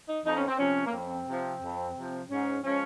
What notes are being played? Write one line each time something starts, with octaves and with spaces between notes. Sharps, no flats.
D#4
F2 D#4
C#4
C4
C3 F3 C#4
A#3
F2 C4
C3 F3
F2
C3 F3
G#2 C#4
F3 G#3 C#4